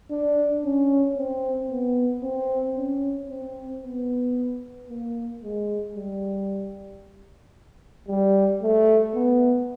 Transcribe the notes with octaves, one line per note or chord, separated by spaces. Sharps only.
D4
C#4
C4
B3
C4
C#4
C4
B3
A#3
G#3
G3
G3
A3
B3